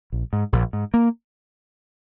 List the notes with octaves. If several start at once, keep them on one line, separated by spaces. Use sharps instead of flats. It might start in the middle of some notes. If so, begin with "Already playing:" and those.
A#1
G#2
A#1
G#2
A#3